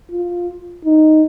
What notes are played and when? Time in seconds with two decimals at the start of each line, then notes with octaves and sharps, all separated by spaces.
0.12 F4
0.85 D#4